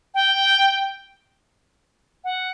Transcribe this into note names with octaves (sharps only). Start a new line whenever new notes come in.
G5
F#5